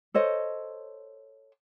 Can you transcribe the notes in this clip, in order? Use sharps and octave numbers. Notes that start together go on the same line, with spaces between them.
A4 C5 C#5 D#5